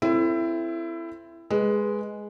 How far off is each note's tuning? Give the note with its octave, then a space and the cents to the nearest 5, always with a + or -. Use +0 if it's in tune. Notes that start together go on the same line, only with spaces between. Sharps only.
C4 +0 E4 +20 A4 +0
G#3 +0 B4 +0